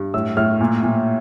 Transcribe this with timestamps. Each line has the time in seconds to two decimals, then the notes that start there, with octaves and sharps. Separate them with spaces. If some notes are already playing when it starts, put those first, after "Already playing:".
Already playing: G2
0.14 A2 E6
0.37 A2 F6
0.61 A#2
0.83 A#2